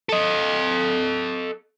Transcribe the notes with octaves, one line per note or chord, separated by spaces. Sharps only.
A4 D#5